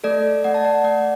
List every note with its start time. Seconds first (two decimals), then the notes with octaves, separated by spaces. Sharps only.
0.04 A3 A4 D5
0.44 A3 D5 F#5
0.54 A5
0.65 D5 F#5
0.84 A3 D5 F#5